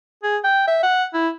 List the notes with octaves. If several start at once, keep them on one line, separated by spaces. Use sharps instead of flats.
G#4
G5
E5
F#5
E4